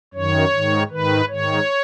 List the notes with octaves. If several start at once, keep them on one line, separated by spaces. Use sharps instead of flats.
F#2 D#3 C#5
G#2 D#3
G#2 D#3 B4
G#2 D#3 C#5